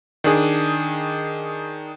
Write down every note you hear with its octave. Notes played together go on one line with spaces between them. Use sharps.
D#3 D4 G#4